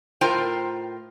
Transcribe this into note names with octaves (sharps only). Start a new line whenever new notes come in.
A2 F4 A#4 C5 G5 A#5